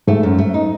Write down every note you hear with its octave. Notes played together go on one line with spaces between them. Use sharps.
G#2 A3
F#2
A3
D#4